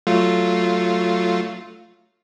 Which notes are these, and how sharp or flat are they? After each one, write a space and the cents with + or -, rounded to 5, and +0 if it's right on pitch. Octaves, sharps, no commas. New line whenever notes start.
F#3 +0 A3 +5 F4 +0